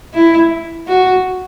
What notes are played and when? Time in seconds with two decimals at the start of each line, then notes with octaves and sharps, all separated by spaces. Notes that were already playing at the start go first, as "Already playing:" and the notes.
0.14 E4
0.87 F#4